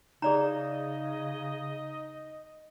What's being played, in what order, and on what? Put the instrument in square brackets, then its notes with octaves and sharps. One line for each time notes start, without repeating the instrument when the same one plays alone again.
[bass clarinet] C#3 [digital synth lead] D#4 [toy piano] G#4 D5 A#5 [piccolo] D#5